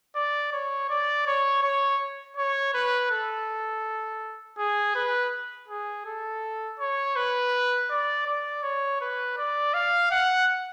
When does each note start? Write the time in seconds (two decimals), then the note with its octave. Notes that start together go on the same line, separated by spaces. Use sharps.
0.15 D5
0.52 C#5
0.89 D5
1.26 C#5
1.63 C#5
2.37 C#5
2.74 B4
3.11 A4
4.58 G#4
4.95 B4
5.68 G#4
6.05 A4
6.79 C#5
7.16 B4
7.90 D5
8.27 D5
8.63 C#5
9.00 B4
9.38 D5
9.74 F5
10.11 F#5